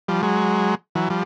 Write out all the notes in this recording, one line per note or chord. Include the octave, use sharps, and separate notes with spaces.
F3 G3
F#3 G#3
E3 F#3
F3 G3